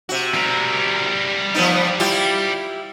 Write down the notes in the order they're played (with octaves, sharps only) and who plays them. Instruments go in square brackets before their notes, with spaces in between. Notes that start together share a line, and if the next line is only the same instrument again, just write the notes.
[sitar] C3 F#4
[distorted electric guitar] G3 A#4
[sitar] F3 B3 D#4
E4 F4 G4